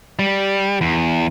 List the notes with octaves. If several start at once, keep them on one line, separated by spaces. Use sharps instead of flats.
G3
E2